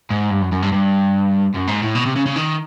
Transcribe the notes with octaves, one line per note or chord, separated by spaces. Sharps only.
G#2
G2
F#2
F#2
G2
G2
F#2
G#2
A2
B2
C3
C#3
C#3
D#3